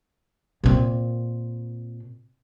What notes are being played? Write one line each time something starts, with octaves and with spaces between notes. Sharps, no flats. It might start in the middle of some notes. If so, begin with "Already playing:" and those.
A#2 C4